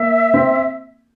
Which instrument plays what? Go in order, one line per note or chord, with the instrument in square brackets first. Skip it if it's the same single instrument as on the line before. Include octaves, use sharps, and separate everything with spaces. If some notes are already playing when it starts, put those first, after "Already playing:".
Already playing: [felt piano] A#3 [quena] E5
[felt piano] C4